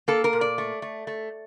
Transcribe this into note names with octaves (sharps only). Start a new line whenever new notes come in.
A#3 A4
A#4
A#2
D5
A3
A3
A3